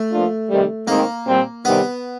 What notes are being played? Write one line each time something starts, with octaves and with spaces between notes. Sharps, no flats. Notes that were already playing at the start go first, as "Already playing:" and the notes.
Already playing: A3
F3 A#3 D4 F4
C3 D#3 G3
D#3 G#3 A#3 C4
A#2 G3 C4
C3 D#3 G3 B3